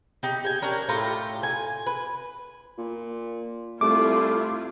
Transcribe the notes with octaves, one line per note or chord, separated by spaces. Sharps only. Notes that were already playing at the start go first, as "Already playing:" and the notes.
D#4 G4
G4 G#5
C#4 D4 A#4
A2 F4 G4 A#5
G#5
B4
A#2
C2 A3 E4 F4 D6